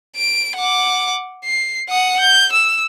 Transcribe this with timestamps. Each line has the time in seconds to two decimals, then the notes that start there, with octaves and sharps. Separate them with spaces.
0.16 D7
0.56 F#5 D6
1.45 C7
1.89 F#5 D#6
2.20 G6
2.52 E6